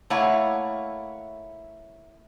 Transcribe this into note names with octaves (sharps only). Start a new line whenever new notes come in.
A3 A#3 E4 C#5 F5 F#5